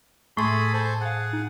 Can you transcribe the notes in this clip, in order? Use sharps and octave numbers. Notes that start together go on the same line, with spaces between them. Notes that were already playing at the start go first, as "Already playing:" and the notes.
A2 A3 G#4 A4 B5 C6
A4 C5 G#5
G#4 F5 F#5 A6
D#4